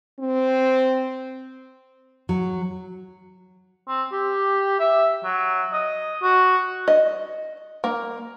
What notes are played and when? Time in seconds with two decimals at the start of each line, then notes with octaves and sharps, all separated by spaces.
0.19 C4
2.29 F#3
3.88 C4
4.12 G4
4.79 E5
5.24 F#3
5.73 D#5
6.23 F#4
6.88 D#5
7.84 A#3